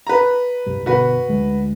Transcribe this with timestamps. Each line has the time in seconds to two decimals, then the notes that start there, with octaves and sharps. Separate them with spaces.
0.07 B4 A#5
0.66 C2 G2 G3
0.86 G1 B2 F#4 B4
1.29 D2 G#3